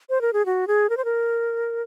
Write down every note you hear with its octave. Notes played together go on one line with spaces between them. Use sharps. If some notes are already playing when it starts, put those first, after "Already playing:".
C5
A#4
G#4
F#4
G#4
A#4
C5
A#4